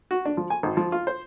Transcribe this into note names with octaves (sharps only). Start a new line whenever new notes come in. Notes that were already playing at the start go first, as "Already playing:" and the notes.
F#4
D4
F3
G#5
G#1
F3
F4
C5